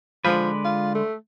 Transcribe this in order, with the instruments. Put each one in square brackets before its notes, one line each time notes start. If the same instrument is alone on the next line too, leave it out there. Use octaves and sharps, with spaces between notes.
[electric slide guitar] D3 G#3 B4 [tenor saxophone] F3
[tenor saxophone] F4
A3